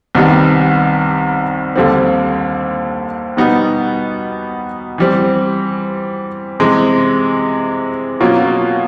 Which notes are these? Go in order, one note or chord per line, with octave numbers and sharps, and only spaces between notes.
C2 C3 D#3 G3 B3
D#2 D3 G3 C4
B2 G3 B3 D#4
E3 G3 C4
C3 E3 G#3
B2 F#3 A#3 C#4 F4